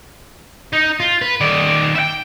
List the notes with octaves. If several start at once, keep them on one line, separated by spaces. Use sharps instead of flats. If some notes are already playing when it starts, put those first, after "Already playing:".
D#4
F4
B4
D#3 D5
E5 G5